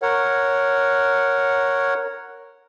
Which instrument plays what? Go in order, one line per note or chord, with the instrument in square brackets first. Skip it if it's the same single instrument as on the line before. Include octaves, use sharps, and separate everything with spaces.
[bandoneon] A#4 C#5 F#5